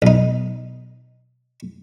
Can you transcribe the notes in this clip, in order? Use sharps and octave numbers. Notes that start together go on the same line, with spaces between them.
B1 D#4